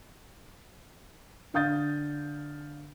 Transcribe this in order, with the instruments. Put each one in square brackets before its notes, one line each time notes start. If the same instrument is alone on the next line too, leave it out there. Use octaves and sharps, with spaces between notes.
[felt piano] D3 F5 D#6 G6 A6